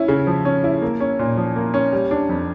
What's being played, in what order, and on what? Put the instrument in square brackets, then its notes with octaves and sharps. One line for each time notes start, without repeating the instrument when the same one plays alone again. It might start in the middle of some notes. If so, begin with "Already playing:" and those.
Already playing: [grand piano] C#4 E4
C#3
F3
C#4
E4
A#3
C#4
A#2
F3
A#3
C#4
G3
D4
F2